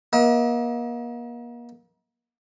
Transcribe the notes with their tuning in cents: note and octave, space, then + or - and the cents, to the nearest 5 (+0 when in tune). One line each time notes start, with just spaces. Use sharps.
A#3 +40 D#5 +45